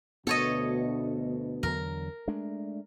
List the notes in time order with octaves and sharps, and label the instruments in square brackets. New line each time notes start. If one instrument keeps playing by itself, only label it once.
[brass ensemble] D2 B2 [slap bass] B3 [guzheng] A4 C#5 D#5
[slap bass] E2 D3 F#3 [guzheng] A#4
[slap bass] G#3 A3 D4